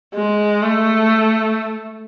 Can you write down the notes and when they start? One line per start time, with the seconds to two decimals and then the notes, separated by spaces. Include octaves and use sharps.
0.14 G#3
0.63 A3